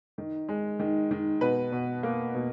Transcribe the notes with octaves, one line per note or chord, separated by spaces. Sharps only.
D#3
G#3
D#3
D#3
B2 B4
B2
A#3
B2